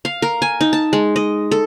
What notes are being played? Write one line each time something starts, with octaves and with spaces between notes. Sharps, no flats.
F5
A#4
G#5
D#4
A5
G#3
D#5
A4